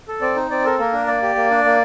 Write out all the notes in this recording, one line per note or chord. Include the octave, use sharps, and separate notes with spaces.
A4
C4 D5
D#4
C4 D5
A4 A#4
A#3 A#4
D4
A#3 D5
G4
A#3
D4
A#3